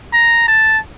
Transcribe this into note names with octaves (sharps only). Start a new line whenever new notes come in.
A#5
A5